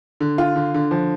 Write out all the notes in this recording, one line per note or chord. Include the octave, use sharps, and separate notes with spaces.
D3
F4
D3
D3
F3